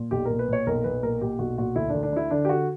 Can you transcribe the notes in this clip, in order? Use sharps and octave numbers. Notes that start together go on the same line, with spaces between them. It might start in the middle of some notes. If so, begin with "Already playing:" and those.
Already playing: A#2
B1 G4
A#2 A#4
B4
A#2 C#5
B1 A#4
B1 B4
A#2 A#4
A#2 G4
B1 F#4
A#2 F#4
D2 E4
D4
D2
D4
D3 E4
D3 D4
G4
D3 F#4